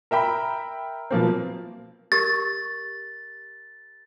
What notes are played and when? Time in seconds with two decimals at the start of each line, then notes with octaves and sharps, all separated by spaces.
0.11 A#4 E5 G5 B5
1.11 B2 F3 A#3 C4
2.12 G4 A#4 C#6 A6